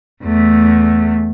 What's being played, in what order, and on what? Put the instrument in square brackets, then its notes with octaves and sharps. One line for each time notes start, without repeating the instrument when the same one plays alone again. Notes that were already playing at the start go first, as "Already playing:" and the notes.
[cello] E2 A3